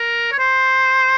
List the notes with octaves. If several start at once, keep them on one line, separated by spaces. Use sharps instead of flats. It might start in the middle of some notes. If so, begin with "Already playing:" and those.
Already playing: A#4
C#5
C5